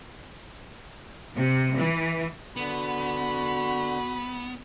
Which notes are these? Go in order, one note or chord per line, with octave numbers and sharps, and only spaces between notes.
C3
E3
D3 B3 F#4 B5